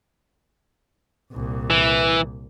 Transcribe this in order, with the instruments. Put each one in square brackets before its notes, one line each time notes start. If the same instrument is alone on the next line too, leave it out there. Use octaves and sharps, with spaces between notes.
[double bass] C2 A#2
[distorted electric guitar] E3